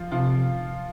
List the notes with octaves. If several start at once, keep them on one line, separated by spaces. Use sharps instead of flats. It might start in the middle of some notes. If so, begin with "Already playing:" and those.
Already playing: F3 F4
C3 F3 F4